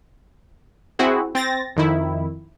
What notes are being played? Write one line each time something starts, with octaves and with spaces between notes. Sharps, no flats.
C4 E4 F#4 G#4
C4 A6 A#6
F2 D#3 E4